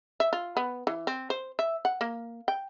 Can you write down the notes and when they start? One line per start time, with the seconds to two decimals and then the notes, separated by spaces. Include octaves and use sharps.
0.20 E5
0.33 F4
0.57 B3
0.87 E3
1.07 C4
1.30 C5
1.59 E5
1.85 F#5
2.01 A#3
2.48 G5